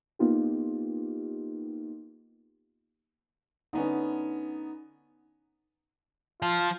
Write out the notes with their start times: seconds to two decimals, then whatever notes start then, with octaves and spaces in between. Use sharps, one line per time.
0.19 A#3 B3 D#4 F4 G4
3.73 D3 B3 C#4 D#4
6.42 F3 F4